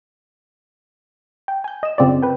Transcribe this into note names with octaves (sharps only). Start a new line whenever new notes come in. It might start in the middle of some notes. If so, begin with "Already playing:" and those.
G5
G#5 G6
D#5 E7
F#2 C#3 C4 F4 D5
B4 G5